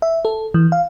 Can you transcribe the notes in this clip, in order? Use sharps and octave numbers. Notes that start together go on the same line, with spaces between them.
E5
A4
E3
F5